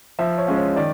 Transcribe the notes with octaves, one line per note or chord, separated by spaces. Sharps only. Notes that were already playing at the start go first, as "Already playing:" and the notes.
F3 E5
C#5
G#3 C#4 F4
C#5
D#3 D5